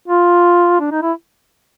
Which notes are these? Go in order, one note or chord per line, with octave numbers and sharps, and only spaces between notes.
F4
D4
D#4
E4